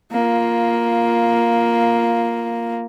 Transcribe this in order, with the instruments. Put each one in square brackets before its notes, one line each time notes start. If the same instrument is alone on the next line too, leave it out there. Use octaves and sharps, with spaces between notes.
[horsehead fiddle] A#3 F4